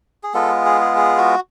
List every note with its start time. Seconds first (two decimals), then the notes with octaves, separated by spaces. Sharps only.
0.23 G#4
0.34 G#3 B3 F4 A4
0.65 G#4
0.81 G#4
0.97 G#4
1.18 F#4